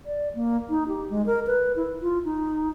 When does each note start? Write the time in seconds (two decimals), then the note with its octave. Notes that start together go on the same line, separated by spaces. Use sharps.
0.06 D5
0.35 A#3
0.70 D#4
0.88 G4
1.10 G#3
1.26 A#4
1.47 B4
1.76 E4
2.02 F4
2.25 D#4